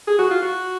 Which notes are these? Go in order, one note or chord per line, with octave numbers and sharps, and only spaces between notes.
G#4
F#4
F4
F#4